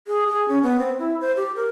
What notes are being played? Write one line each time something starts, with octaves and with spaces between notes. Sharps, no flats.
G#4
G#4
C#4
B3
C4
E4
C5
G4
A#4